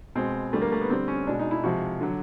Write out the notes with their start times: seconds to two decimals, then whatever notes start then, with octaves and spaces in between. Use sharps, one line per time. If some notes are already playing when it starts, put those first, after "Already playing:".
0.15 B2 G#3 C4
0.53 D3 G3 A3
0.62 A#3
0.72 A3
0.81 B3
0.89 D3 G3 C4
1.08 C#4
1.27 B2 G#3 D4
1.39 D#4
1.51 E4
1.64 C3 F3 G#3 F#4
2.01 D3 F#3